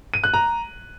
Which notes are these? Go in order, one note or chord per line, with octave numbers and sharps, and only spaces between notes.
D#7
F#6
A#5